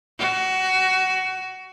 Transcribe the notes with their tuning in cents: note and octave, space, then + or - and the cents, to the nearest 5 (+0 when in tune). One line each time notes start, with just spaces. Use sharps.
F#4 +20